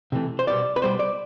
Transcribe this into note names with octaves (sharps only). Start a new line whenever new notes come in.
C3 E3 A3
C5
B2 G3 B3 D5
B4
B2 G3 B3 C5
D5